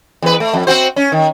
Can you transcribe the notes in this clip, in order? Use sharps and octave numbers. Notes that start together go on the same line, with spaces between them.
E2 B4
A3
F2
C4 F#4 C5
C#4
D#3